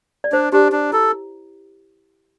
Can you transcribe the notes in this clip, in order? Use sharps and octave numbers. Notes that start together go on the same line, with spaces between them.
D5
D4 C5
D4 G4
D4
E4 A4